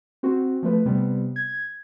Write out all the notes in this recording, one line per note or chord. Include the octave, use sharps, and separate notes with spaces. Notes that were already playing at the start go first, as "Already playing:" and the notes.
C4 F#4
F3 A3 B4
C3 G3 B3
G#6